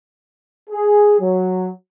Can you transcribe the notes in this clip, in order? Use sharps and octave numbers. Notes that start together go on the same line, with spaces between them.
G#4
F#3